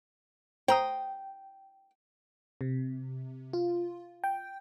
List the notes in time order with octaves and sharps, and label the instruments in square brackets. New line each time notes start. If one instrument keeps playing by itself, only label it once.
[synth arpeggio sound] C5 A#5 D#6 [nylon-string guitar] G5
[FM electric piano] C3
F4
G5